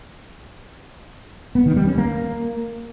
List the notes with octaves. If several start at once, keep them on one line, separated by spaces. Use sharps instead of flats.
B3
D#3
G3
C#4
A#3